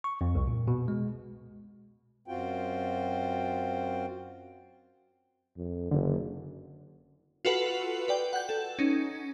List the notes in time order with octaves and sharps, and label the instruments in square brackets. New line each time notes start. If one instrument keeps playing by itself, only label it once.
[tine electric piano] C#6
F2
C2
A#2
B2
G#3
[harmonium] F#2 C4 F4 F#4 G5
[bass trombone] F2
[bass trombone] F#1 [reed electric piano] D3
[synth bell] F4 F#4 A4 B4 F#5
B4 D5 G5
F#5 G6
A4
C#4 D#4